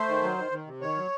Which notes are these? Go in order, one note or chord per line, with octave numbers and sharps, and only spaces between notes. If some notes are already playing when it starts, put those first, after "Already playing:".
Already playing: A3 C5
D#3
F#3
D#3
D#3
C3
D#3 C#5
F#3